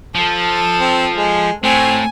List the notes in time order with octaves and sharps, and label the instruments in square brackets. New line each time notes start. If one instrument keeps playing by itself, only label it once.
[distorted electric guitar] F3 [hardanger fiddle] A4
[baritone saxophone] C4
G#3
[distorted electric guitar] A2 [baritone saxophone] C4 [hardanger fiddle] G#5